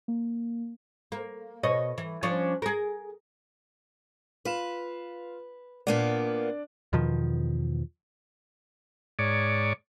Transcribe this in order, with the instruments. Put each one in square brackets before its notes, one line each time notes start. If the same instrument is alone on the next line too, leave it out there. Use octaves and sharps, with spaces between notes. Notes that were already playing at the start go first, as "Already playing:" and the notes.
[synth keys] A#3
[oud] A#3
B2 C#5 D#5
E3
F3 C#4 D4
G#4 A#4
[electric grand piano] F4 F5 E7 [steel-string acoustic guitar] B4
[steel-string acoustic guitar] A#2 A#3 B3 [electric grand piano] D4 D5
[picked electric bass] E2 B2 D#3 F3
[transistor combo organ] G#2 C#5 D5